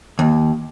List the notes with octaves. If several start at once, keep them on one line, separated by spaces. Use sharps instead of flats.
D#2